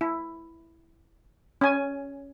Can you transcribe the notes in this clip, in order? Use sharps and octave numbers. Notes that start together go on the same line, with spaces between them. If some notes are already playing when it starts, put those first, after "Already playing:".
E4
C#4 G#5